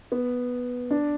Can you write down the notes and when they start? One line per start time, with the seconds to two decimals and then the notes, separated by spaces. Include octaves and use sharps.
0.12 B3
0.91 D4